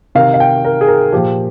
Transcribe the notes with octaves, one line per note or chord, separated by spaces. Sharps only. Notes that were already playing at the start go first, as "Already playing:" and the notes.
C3 D#3 F5
F5
G5
A#4
G#4
A#4
A#2 F3 G4